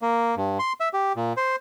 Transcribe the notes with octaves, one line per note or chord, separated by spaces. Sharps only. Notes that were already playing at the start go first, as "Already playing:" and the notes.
A#3
G2
C6
E5
G4
A#2
C5